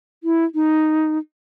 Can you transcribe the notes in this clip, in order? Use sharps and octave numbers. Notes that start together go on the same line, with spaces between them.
E4
D#4